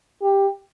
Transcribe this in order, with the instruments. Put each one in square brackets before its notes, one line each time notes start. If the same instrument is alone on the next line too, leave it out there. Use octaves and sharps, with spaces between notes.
[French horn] G4